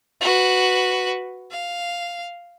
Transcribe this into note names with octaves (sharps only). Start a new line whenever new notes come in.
F#4 B4
F5